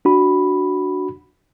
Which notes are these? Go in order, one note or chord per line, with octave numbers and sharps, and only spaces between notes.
D4 F#4 B5